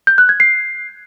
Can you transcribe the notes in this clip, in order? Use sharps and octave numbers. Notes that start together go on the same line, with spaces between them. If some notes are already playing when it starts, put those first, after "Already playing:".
G6
F#6
G#6
C7